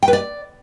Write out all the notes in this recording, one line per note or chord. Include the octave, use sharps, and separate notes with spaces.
G5
B4
D5